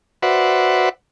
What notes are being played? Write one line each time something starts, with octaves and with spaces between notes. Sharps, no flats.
F#4 B4 C5 D5 E5 F#5